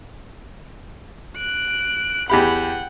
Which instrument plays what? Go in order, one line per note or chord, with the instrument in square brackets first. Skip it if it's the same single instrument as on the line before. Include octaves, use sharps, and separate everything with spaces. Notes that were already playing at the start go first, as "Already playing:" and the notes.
[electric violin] F#6 D7
[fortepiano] E2 G4 B5 [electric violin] F#5 G5